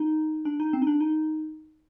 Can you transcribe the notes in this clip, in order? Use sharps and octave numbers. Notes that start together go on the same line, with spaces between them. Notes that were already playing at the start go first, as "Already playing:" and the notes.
Already playing: D#4
D4
D#4
C4
D#4
D4
D#4